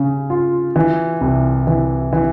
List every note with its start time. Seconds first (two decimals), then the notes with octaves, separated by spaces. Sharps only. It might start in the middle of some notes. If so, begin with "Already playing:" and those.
Already playing: C#3
0.30 F4
0.76 E3
1.21 C2
1.67 E3
2.13 E3